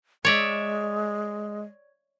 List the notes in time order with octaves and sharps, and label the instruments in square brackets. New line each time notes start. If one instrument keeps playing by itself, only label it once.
[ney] G#3 [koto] C#5 D5 E5